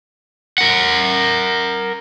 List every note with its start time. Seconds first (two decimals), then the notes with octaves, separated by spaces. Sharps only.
0.58 A#4 F#5